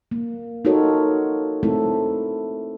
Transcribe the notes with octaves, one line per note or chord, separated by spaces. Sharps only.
A#3
D#4 F4 F#4 A4 A#4 C#5
A3 C4 E4 A4